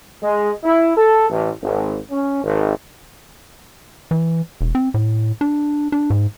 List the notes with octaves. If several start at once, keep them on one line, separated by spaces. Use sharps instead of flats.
G#3
E4
A4
A1
G#1
C#4
G#1
E3
E1
C4
A2
D4
D4
G#2